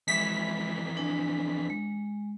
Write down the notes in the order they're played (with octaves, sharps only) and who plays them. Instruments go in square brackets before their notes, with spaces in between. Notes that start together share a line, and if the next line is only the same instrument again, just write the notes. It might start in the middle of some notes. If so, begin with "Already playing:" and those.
[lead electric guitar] F2 E3 [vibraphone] G#3 E5 [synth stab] B6
[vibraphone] D4 G#5
G#3